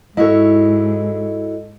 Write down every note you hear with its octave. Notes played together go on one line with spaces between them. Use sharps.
G#2 E4 F#4 A4 C#5 D#5